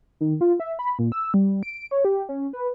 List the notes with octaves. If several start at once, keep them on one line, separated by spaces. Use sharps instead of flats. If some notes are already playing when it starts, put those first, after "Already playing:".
D#3
F4
E5
B5
A#2
E6
G3
D7
C#5
G4
C#4
B4